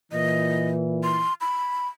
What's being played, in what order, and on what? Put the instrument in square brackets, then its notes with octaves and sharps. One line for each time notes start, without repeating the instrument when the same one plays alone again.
[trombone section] A#2 E3 [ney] D#5
[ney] C6
B5